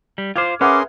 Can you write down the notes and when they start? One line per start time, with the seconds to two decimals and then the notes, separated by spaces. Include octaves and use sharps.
0.18 G3
0.36 F4 C5 D6 F6 G#6
0.61 C#4 G#4 A#4 B4 E5 F#5 C6 D6